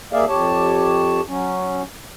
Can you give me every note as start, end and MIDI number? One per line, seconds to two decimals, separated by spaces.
0.13 0.25 39
0.13 0.25 58
0.13 0.25 68
0.13 0.25 74
0.13 0.25 76
0.13 0.25 77
0.28 1.21 41
0.28 1.21 67
0.28 1.21 73
0.28 1.21 81
1.28 1.82 54
1.28 1.82 61